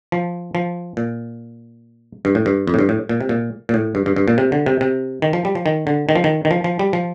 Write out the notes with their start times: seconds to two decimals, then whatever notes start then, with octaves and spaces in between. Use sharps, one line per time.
0.12 F3
0.55 F3
0.97 A#2
2.25 G2
2.35 A2
2.46 G2
2.67 F2
2.74 A2
2.79 G2
2.89 A2
3.09 A#2
3.21 C3
3.29 A#2
3.69 A#2
3.74 A2
3.95 G2
4.06 G2
4.16 G2
4.28 A#2
4.38 C3
4.52 D3
4.66 C3
4.81 C3
5.22 D#3
5.33 F3
5.45 G3
5.55 F3
5.66 D#3
5.87 D3
6.09 D#3
6.16 F3
6.24 D#3
6.45 D#3
6.51 F3
6.64 F3
6.79 G3
6.93 F3